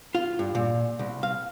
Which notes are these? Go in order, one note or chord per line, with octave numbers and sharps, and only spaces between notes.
F4
G2
A#2
C2
F5